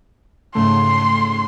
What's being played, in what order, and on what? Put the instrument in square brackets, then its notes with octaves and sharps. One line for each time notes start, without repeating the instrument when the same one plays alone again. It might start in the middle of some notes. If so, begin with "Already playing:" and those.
[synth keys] G#2 C#3 A3 [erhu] C6